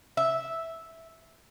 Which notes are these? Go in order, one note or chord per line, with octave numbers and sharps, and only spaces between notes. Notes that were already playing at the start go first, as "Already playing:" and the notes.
E5